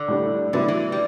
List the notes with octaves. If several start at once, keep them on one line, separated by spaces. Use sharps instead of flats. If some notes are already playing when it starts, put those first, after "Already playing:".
Already playing: D3
A2 G3 D4
A2 D3 F#3 B3 E4
E3
G3